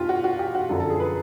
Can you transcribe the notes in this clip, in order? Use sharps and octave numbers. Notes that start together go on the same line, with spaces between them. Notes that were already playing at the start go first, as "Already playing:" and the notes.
Already playing: E2 B2 F4 G4
F#4
F#4
G4
F#4
F#2 D3 F3 A4
A4
G#4
B4